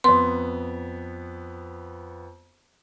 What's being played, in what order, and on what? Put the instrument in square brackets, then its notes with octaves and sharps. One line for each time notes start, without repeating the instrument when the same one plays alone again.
[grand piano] F2 B3 [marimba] C6